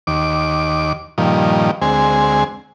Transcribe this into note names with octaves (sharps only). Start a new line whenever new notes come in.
D#2 D6
G2 A#2 D#3 F3
D2 G#3 C4 G#5